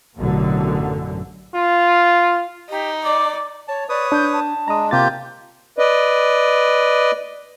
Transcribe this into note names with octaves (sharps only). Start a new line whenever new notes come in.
A1 F#2 B2 D3
F4
D#4 G4
D5 D6
C#5 A5
B4 C#5 D5 D#6
D4 G6
A5
G#3 D4 A#5 D#6
C3 A#3 F4 G4 G6 A6
B4 D5 D#5